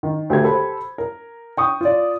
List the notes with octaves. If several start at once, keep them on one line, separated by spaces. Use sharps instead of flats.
D#3
D2 G4 A4 G#6
G4 A4 C5 B5
A#4
G5 C#6 D#6
F4 D5